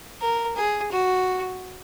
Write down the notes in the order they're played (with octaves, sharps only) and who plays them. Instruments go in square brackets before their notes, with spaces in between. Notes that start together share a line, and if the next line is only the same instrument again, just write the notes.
[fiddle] A#4
G#4
F#4